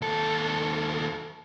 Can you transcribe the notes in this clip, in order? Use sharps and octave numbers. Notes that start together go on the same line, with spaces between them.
D#2 A4